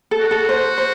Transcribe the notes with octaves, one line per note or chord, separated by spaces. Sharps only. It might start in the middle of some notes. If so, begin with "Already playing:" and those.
A4
F#4
A4
C5
C5